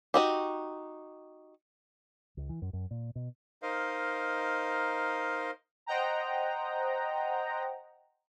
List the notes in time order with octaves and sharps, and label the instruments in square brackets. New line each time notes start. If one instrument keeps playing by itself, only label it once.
[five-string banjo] D#4 F#4 G4
[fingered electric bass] C#2
E3
F#2
F#2
A#2
B2
[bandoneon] D#4 A#4 C5 D#5 F5
[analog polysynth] C5 D#5 F#5 G5 A#5